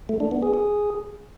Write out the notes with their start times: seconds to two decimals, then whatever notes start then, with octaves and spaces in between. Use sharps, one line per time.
0.09 A3
0.20 D4
0.31 B3
0.43 G#4
0.54 G#4